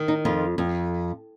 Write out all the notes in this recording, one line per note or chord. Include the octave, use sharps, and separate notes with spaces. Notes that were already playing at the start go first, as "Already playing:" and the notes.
Already playing: D#3
D#4
F2 F4
F2